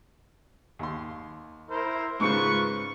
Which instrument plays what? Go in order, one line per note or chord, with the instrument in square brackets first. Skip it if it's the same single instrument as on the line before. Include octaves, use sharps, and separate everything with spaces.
[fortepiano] D#2 C6
[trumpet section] E4 A#4 C5
[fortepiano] G#2 C#3 [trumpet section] F4 B4 C#6